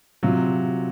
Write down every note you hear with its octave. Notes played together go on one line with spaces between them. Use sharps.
C3 F#3 F4